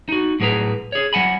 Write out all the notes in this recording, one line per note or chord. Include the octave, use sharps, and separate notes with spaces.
D#4 F#4
A2 F#3 G#4 B4 A#5
G#4 C#5
F#3 F#5 G#5 B5